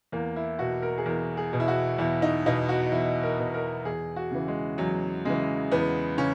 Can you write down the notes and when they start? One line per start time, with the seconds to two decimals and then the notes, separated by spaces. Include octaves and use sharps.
0.12 E2 A#3
0.36 E4
0.59 B2 F#4
0.82 A#4
0.98 G#4
1.06 E2 A#4
1.37 G#4
1.53 B2
1.60 E4
1.68 F#4
1.98 E2 E4
2.22 D#4
2.46 B2 D#4
2.69 F#4
2.92 E2 E4
3.23 A#4
3.39 B2
3.54 A#4
3.85 E2 G#4
4.16 F#4
4.31 C#3 E3
4.48 G#3
4.78 E2 F#3
5.25 C#3 E3 G#3
5.71 E2 B3
6.18 C#3 C#4